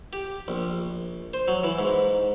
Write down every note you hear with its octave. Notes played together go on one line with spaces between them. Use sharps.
G4
A#1
C5
F#3
E3
G#2